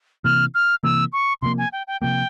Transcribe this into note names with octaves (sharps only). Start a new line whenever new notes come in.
C3 E3 A#3 F6
F6
C3 E3 A#3 E6
C#6
C3 F3 A#3 C6
G#5
G5
G5
C3 F3 A#3 G5